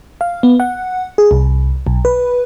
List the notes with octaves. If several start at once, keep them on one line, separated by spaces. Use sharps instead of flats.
F5
B3
F#5
G#4
C2
B1
B4